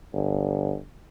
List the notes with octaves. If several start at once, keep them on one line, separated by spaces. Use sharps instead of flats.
G1